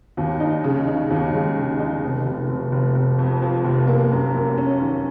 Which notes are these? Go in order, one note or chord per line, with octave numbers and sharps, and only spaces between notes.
D#2
D#4
C#3
D#4
D#2
G#3
C#3
D#4
F1
F1
F1
F1
F1
F2
F3
F1
A#3
F#2
A#3
C#4
D#3